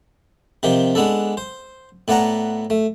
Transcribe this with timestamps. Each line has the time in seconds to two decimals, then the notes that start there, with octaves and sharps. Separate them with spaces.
0.63 C3 D#3 F3 G4
0.95 G#3 B3 D4 A4
1.37 C5
2.08 A2 B3 D5 F#5 A5 A#5
2.70 A3